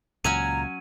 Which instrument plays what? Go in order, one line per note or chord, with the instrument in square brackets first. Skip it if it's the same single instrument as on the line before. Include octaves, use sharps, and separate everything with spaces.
[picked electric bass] C#2 A#2 [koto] F#3 C#4 G#5 [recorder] A#5 [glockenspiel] D#7